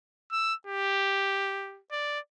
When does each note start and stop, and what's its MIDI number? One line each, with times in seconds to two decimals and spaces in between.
0.32 0.54 88
0.67 1.81 67
1.92 2.19 74